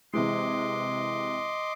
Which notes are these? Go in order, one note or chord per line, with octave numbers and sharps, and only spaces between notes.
C3 E3 G#3 D#5 C6 D6